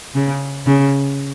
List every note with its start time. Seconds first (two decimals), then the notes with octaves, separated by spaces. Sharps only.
0.14 C#3
0.67 C#3